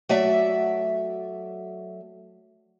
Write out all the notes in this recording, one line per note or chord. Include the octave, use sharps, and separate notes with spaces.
F#3 A3 D5 E5